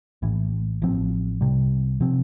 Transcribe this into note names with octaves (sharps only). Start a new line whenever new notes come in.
A#1 A2 E3
A1 A2 F3 C4
C2 C3 G3
C3 F3 C4